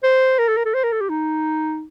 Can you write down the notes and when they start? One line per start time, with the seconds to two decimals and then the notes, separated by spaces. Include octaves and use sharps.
0.03 C5
0.39 A#4
0.48 A4
0.57 A#4
0.65 A4
0.74 C5
0.84 A#4
0.92 A4
1.01 G4
1.09 D#4